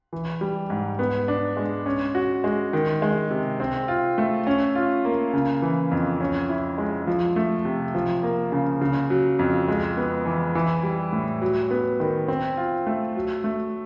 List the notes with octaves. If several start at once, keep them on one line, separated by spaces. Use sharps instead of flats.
E3
G3
G#2
B3
D4
G#3
C#4
F#4
G#3
D#3
G#3
C3
C4
F4
A3
C#4
F4
A#3
C#3
E3
F2
C#4
E4
G#3
F3
A3
C3
F3
A#3
C#3
C#3
F#3
F2
G#3
B3
E3
E3
G3
A2
F#3
B3
D#3
C4
F4
A3
F#3
A3